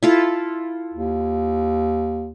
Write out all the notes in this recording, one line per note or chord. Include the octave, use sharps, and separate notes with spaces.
E4 F4 A4
D#2